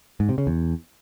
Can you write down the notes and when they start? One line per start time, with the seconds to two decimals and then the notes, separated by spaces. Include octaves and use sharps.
0.20 G#2
0.29 C3
0.38 C#3
0.47 E2